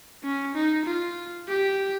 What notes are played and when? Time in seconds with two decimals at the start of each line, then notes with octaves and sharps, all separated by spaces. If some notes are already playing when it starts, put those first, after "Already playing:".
0.23 C#4
0.55 D#4
0.85 F4
1.48 G4